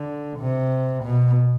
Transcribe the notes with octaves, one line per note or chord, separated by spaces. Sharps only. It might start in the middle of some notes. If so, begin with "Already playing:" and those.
Already playing: D3
C3
B2